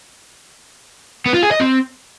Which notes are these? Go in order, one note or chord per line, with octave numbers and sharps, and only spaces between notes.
B3
F4
G#4
D#5
C4